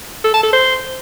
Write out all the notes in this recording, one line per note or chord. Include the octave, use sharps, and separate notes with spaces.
A4
A5
A4
C5